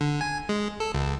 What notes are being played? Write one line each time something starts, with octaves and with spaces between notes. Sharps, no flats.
D3
G#5
G#3
A4
C#2